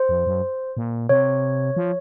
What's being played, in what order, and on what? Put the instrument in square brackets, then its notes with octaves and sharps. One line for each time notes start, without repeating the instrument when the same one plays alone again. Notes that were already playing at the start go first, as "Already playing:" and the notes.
Already playing: [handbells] C5
[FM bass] F2
F#2
A#2
[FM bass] C3 [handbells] C#5
[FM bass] F3